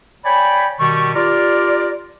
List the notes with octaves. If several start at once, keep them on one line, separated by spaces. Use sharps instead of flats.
C#5 D5 G5 G#5 B5
B2 D#3 G3 C#6
F4 G4 A#4 D5